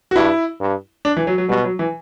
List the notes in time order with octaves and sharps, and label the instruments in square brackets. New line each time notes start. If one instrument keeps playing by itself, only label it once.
[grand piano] F#4
[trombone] G2 [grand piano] E4
[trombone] G2
[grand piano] D4
E3
F#3
F#3
[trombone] B2 [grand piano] G3
[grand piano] F#3
E3